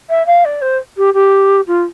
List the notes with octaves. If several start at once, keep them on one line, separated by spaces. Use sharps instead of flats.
E5
F5
D5
C5
G4
G4
F4